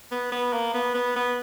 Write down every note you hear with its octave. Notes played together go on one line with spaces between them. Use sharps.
B3
B3
A#3
B3
B3
B3